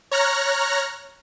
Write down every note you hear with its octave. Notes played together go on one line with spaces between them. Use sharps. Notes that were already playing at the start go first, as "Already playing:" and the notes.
C#5 A#5 F6 F#6 A#6